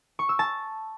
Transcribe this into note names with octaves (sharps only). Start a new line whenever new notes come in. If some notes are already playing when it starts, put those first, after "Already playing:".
C#6
E6
A5